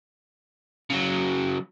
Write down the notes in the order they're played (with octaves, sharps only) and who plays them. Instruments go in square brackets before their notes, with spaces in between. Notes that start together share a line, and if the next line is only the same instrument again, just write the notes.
[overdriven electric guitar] C#3 F#3